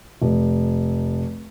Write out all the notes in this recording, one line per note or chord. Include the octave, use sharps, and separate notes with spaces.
F1